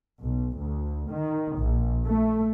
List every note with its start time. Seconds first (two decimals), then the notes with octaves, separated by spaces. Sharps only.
0.22 B1
0.57 D2
1.10 D#3
1.58 A#1
2.05 A3